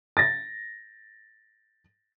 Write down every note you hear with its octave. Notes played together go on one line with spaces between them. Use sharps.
A6 A#6